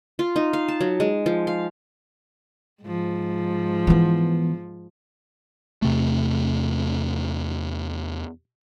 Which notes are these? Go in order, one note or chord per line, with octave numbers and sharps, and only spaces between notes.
F4
D#4
F5
A5
F#3
G#3
F3
F5
G#2 F3
E3 B3
E2 C3 A3